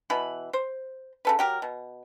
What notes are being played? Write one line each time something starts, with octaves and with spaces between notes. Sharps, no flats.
B2 E3 B5
C5
C#3 A4 B4
F#3 G4 A#4
B2